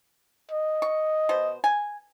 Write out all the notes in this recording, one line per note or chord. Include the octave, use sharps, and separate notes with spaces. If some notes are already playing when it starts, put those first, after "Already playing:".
D#5
C#6
B2 C5
G#5